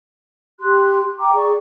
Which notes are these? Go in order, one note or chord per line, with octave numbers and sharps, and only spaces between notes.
G4 C6 F#6
G5 A#5 D6
G#4 D5 C#6